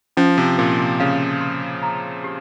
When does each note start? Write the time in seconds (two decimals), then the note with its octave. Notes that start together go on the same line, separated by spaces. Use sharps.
0.17 F3 C#4
0.38 C3
0.58 A#2 C5
0.79 C3
1.00 C#3 F5
1.41 C6
1.82 A#5
2.24 G4